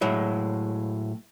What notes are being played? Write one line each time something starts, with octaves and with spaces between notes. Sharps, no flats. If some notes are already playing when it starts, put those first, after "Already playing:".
A2 F#3 G#3